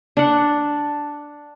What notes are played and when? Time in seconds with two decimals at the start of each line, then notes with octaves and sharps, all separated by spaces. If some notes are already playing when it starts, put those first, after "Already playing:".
0.17 D4 F#5